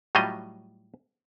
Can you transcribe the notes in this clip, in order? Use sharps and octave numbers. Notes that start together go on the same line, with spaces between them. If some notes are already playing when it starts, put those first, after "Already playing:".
A2 F#3 G3 F4 D#5